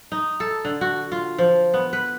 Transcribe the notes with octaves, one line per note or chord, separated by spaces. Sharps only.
D#4
A4
D3
F#4
F4
F3
B3
B4